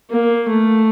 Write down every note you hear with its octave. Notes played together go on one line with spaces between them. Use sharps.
A#3
A3